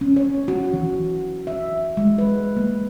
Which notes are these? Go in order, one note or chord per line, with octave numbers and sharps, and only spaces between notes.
C#4
C#5
F#4
E3
E5
G#3
B4
A#3